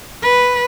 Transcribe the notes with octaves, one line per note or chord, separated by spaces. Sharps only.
B4